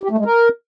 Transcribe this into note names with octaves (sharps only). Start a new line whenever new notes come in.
G4
A3
G#3
A#4